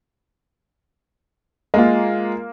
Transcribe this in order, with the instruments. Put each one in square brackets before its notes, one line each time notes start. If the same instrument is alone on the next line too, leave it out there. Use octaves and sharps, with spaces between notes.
[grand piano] G#3 F4 [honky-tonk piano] A#3